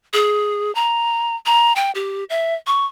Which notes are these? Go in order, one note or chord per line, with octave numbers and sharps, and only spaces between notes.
G#4
A#5
A#5
G5
G4
E5
C#6